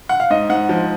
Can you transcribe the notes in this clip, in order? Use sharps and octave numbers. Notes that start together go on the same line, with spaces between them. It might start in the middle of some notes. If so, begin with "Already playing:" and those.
F#5
F5
G#2 D#5
G#2 F#5
F3